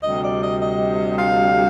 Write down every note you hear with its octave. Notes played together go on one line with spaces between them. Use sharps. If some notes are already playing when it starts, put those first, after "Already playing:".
D2 C3 G3 D#5
D5
D#5
D#5
F5